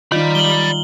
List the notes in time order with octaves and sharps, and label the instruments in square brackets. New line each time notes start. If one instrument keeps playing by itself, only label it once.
[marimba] D#3 [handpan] D#4 F4 [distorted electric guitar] D5 B5
[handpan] G3 [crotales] F#7 G7